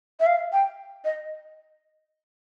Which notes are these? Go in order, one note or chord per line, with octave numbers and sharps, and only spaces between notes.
E5
F5
G5
D#5